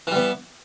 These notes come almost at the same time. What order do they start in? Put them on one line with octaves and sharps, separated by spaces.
E3 G3 B3